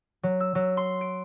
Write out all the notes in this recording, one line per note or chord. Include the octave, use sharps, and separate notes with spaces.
F#3
E6
F#3
C6
D7